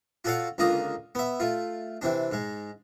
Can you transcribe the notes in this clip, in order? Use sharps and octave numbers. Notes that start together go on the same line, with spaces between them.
F4 F#4 A4 C#5 F5 F#5
C#2 D3 A#3 F4 A#5 D#6
B3 E5
A3 F4
C3 E3 C4 D4
G#2 G#3